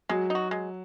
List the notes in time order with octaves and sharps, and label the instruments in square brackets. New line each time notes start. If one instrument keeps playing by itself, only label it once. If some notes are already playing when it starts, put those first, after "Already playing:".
[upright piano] F#3 [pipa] G#3
[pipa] D#4 F#4
G#3